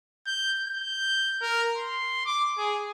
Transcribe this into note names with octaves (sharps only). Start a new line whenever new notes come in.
G6
G6
A#4
C6
D6
G#4